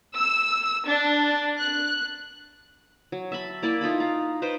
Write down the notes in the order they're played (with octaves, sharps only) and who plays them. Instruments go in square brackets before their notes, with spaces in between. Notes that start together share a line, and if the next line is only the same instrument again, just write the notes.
[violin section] E6
D4
F#6
[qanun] F#3
E5 A5 B5
A#3 E4 D5 B5
D#4 F4 A4 B5
F5 A#5
D#4 B4 C5 G5